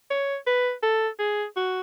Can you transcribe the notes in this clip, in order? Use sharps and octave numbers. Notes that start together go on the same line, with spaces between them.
C#5
B4
A4
G#4
F#4